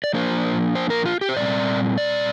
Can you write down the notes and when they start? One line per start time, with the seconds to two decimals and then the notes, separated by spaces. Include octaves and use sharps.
0.04 D5
0.13 F3 A#3 D4 C5
0.75 C5
0.90 A#4
1.06 F4
1.21 G4
1.29 C5
1.36 A#2 G3 C4 D5
1.98 D5